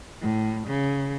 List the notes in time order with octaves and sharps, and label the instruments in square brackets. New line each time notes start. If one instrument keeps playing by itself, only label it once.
[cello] A2
C#3